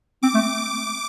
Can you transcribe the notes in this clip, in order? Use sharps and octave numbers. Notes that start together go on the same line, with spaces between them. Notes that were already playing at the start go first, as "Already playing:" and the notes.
C4 D6
A3